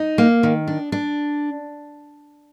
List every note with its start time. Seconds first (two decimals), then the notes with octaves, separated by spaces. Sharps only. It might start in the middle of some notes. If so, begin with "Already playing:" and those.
Already playing: D#4
0.18 A#3
0.43 D#3
0.67 D4
0.92 D4